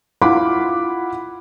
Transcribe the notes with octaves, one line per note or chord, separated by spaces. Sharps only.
E4 F4 F5 F#5 B5 D6